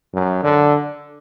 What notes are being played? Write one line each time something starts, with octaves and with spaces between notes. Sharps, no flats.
F#2
D3